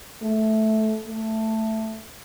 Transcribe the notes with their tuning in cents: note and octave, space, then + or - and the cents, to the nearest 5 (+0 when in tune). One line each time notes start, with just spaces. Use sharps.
A3 -10
A3 +5